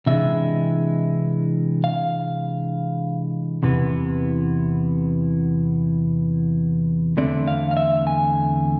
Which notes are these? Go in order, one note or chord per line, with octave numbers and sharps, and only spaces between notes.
C3 E3 G#3 D4 E5
F5
E2 C3 E3 B3
E2 D3 A3 C4 D5
F5
F5
E5
G#5